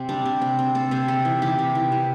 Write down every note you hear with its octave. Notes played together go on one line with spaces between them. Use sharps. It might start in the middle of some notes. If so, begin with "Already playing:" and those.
Already playing: C3 C4
G3 D4
C3
C4
C4
C4 A4
C3 C5
C3 A4
E3
E3 G4
C3
E3
C3